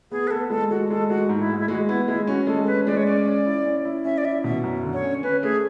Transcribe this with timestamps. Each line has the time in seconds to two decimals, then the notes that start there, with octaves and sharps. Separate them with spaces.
0.11 B3 G#4
0.27 B4
0.30 B3 A4
0.50 G#3 A4
0.70 G#3 F#4
0.90 G#3 A4
1.09 G#3 F#4
1.29 G#2
1.40 E4
1.49 G#3
1.59 E4
1.68 G#3 F#4
1.88 B3 E4
2.08 G#3 E4
2.27 C#4 F#4
2.47 G#3 A4
2.63 A4
2.67 C#4 B4
2.87 G#3 D5
2.97 C#5
3.06 C#4 D5
3.26 C#4
3.46 E4
3.65 C#4
3.85 E4
4.05 C#4 E5
4.18 D5
4.24 E4 E5
4.44 B2 E5
4.64 F#2
4.83 D3
4.93 C#5
5.03 C#4
5.23 C#4 B4
5.43 A3 G#4